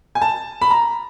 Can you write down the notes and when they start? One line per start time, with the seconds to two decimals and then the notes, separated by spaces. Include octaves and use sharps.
0.15 G#5
0.22 A5
0.61 B5
0.71 A#5